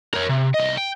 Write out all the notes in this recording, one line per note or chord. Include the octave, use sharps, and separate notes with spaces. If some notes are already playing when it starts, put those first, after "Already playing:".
A#4 C#5
C3
C2 D#5
G5